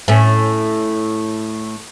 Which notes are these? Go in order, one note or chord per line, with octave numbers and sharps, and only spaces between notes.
A2 C#4